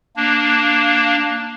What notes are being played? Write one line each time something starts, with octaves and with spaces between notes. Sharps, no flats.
A#3 D4